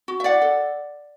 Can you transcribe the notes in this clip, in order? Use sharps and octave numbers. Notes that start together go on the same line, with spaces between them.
F#4
E5
E4 D5 F#5
A4